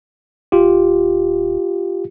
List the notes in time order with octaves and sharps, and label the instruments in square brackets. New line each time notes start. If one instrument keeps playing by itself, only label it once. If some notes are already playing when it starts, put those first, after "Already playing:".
[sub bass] D#1 [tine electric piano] F4 G4